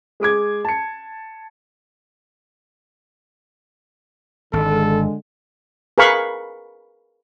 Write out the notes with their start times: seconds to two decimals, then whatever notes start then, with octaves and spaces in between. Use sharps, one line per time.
0.20 G#3 G#4 D6 G#6
0.65 A5 C#7
4.53 G#1 D3 G#3 A4
5.98 G#4 A#4 B4 F5 B5 C#6